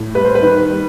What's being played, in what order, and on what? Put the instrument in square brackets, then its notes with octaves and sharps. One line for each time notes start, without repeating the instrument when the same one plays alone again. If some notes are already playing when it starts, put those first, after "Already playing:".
Already playing: [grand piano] A2
G3 B4
C5
B4
D#3
G3